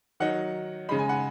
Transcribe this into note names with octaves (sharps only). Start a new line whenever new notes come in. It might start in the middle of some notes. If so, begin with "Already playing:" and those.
D#3 F#3 D#4 F#5
C#3 G#3 D#4 B5
G#5
F#5